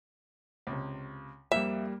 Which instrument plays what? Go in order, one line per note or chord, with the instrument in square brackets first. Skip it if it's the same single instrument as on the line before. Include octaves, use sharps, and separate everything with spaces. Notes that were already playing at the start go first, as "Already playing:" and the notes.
[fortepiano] C#2 C3
[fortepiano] F2 [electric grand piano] G3 A#3 [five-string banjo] E5